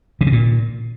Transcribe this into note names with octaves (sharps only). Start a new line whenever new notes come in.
C3
C#3
A#2